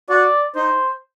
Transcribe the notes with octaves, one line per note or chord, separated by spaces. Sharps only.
F#4 D5
D#4 C5